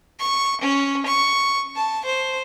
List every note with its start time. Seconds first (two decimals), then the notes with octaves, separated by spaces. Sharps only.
0.20 C#6
0.62 C#4
1.06 C#6
1.76 A5
2.05 C5